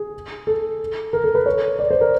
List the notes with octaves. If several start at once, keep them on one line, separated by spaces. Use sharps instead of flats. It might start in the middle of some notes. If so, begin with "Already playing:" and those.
Already playing: G#4
A4
A#4
A4
B4
C#5
D5
C5
A#4